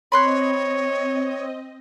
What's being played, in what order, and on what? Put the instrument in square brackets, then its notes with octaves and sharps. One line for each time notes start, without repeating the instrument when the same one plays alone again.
[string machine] C4 D#5 [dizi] C#5 [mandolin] B5 C6 F#6